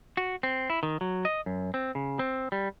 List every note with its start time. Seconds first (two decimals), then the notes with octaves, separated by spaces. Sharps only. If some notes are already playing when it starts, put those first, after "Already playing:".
0.17 F#4
0.43 C4
0.70 E4
0.83 D#3
1.01 F#3
1.25 D#5
1.46 F#2
1.74 C4
1.95 C#3
2.19 C4
2.52 G3